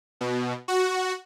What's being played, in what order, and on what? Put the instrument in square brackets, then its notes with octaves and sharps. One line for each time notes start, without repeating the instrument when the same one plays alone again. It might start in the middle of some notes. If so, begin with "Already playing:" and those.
[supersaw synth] B2
F#4